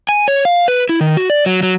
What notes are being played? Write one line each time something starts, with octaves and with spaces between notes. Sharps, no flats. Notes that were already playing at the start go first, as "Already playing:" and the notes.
G#5
C#5
F5
B4
E4
D#3
F#4
D5
F#3
F#3